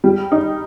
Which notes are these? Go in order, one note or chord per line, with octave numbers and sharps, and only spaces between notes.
G3
D#4